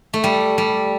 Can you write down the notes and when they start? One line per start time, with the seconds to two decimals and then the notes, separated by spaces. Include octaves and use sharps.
0.14 A3
0.24 G3
0.58 G3